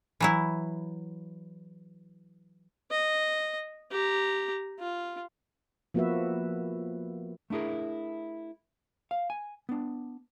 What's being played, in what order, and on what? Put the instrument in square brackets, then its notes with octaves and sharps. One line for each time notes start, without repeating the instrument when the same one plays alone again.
[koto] E3 F#3 E4
[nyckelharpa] D#5
G4 A#5
F4
[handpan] F3 A#3 B3 F#4 B4 E5
[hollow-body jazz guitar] A3 D4 E4 G#4 A#4
F5
G#5
B3 D4